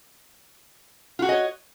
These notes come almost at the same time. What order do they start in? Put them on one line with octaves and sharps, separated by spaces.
F4 F#4 G#4 D#5 C#5